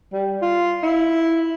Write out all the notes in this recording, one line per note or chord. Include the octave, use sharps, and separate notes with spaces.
G3
F4
E4